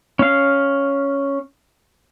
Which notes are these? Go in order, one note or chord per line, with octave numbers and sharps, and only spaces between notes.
C#4 F5